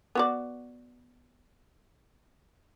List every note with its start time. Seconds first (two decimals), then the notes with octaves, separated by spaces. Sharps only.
0.15 B3 F#4 D5